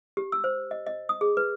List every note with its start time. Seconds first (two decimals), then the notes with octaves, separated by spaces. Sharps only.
0.17 G4
0.32 E6
0.44 C5
0.71 D#5
0.87 D#5
1.09 D#6
1.21 G#4
1.37 B4